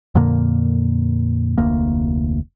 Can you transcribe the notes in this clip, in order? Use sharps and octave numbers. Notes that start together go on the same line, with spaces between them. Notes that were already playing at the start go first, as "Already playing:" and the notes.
F2 A#2 D3 A#3
F1 D2 A#3